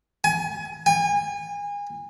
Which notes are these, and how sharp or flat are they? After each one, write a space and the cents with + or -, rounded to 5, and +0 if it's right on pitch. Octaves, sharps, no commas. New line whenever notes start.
G#5 +25
G#5 -30